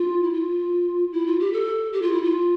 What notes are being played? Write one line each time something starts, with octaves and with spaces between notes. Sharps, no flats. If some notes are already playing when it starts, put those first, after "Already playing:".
Already playing: F4
E4
F4
E4
F4
G4
A4
G4
F4
E4
F4